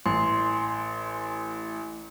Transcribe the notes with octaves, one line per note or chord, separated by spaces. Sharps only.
A1 C6